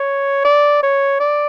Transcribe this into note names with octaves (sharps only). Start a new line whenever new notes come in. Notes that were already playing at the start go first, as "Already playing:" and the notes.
Already playing: C#5
D5
C#5
D5